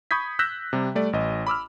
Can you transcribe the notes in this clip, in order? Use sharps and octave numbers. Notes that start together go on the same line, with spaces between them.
B5 C#6 D#6 G6 G#6 B6
E6 F#6 G6 A#6 B6 E7
C3 G3
G3 A3 D5
A1 D#5
B5 D6 E6 F6